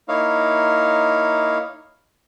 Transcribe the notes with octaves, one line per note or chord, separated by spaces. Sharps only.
A#3 D#4 E4 C#5 F5